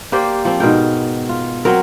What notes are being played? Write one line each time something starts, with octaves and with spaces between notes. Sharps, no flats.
A#3 G4 C5 D5
F3 C4
G#2 B2 A#4 G5
F4
F#3 C4 A#4